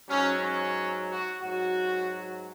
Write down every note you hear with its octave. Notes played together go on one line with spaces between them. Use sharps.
G#2 F#3 C#4
C#4
F#4
G#2 F#3 F#4